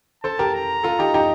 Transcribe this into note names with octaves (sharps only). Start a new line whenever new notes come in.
A4 C5 A5
G4 A#4
A#5
F4 A4
D#4 G4
D#4 G4